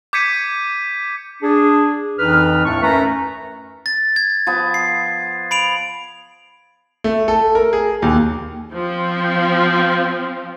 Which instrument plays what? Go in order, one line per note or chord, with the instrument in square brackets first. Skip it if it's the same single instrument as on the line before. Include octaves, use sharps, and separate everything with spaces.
[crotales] D6 G6 G#6 B6 C#7 D#7
[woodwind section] D4 G#4
F2 E3 D#4 B4 F6
D#2 A2 A3 D4 C#6
F#2 A3 C#4 B4 E5 A#5
[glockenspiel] A6
G#6
[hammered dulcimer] F3 B3
[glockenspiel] C7
B5 D7 F7
[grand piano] A3
A4
A#4
G#4
D#2
[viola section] F3 C4